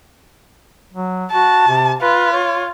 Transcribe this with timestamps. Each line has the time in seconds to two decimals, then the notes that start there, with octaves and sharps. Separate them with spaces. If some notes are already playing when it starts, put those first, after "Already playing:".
0.93 F#3
1.32 F#4 A5
1.68 C3
2.02 F4 B4
2.33 C#5